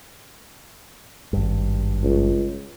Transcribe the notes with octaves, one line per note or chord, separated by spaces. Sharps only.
G#1 G2
C#2